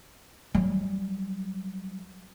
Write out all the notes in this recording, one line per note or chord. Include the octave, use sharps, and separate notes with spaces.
F#3 G3